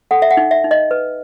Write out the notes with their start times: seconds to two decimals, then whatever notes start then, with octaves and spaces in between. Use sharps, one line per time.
0.11 A4 F#5
0.22 E5
0.31 F#5
0.37 D#4
0.51 E5
0.64 D#4
0.71 D#5
0.91 B4